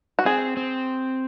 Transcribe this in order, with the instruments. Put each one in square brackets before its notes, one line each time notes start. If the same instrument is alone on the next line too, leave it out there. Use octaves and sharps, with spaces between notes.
[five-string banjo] F#4
[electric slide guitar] C4 [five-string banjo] G#4
[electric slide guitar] C4